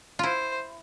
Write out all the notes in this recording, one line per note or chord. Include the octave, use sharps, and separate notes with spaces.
E4 F4 C5